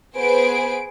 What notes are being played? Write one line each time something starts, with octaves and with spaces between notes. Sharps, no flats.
B3 G#4 B4 C5 D7